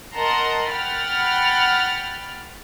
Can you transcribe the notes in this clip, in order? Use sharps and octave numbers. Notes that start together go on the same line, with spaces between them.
A#4 D#5 F#5 A5 A#5 C6
F#5 G5 B5 F6 A6